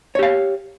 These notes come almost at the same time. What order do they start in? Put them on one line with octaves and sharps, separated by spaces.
C#5 G4 F5